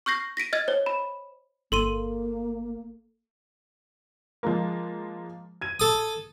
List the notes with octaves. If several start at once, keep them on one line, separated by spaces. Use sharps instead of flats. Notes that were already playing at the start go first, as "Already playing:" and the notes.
C#6 F6 G6 A#6 C7
A#6 B6 D7 D#7
D#5 F6 G#6 A6
C5 C#5
B5
G1 A#3 A4 C6 D#7
F3 G#3 A#3
G#6 D#7
A4 D#6